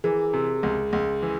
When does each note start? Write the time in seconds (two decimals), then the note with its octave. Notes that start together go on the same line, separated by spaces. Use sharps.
0.04 E3 G#4 A#4
0.33 C3
0.63 C#2
0.93 C#2
1.22 E3